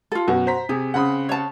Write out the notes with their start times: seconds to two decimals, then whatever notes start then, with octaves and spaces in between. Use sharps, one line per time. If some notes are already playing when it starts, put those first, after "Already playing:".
0.12 F4 A4
0.28 F#2 B2 F#4
0.47 C5 A#5 B6
0.69 C3 G#4
0.94 C#3 C4 F#5 B5 D#6
1.29 C#5 A5